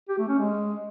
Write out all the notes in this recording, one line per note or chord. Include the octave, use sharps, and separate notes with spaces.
G4
A3
C#4
G#3